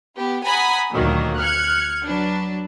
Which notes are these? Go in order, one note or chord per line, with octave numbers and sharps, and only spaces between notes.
B3 G4
F#5 G#5 A#5 B5 D#6
D2 A#2 D#3 F#3 A#3
F6 F#6 G#6 C#7
F#3 D4 B4